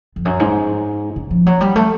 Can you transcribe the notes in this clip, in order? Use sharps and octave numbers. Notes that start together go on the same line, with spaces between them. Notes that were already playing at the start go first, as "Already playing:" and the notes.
F2
F#2
G#2
C#3
F3
F#3
G3
A3